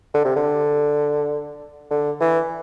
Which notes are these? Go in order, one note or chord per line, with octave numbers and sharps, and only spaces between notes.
D3
C3
D3
D3
E3